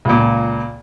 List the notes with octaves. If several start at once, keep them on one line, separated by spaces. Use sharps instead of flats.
C#2 A#2